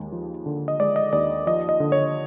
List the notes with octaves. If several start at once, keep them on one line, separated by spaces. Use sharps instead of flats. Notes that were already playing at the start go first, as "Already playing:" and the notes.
Already playing: D#2 G#3
F3
D3
D#5
G#3 D5
D#5
D#2 D5
F3 D#5
D#5
D3
C#5